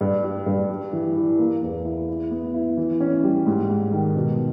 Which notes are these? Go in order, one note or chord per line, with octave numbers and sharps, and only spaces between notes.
G2
G3
G2
G3
E3
E3
A#3
E2
E4
E4
B3
E4
E3
C#4
G3
G#2
G#2
D#3
B2